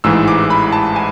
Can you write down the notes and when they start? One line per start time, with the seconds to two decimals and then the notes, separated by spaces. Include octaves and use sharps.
0.04 A1 G#2 E3 G#3 E6
0.28 D6
0.50 B5
0.72 A5
0.96 G#5